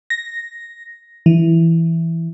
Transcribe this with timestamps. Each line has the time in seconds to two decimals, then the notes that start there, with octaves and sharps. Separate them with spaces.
0.10 A#6
1.26 E3